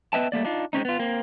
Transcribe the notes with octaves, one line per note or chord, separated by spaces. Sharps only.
B3 B4 D#5 E5 G5 A5
G3 A3 A#3 D5
D4 D#4 F4
G#3 C4 C#4 D#4
B3 F4
A#3 C4